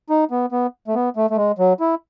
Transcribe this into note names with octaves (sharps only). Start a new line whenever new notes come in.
D#4
B3
B3
A3
B3
A3
A3
G#3
F#3
E4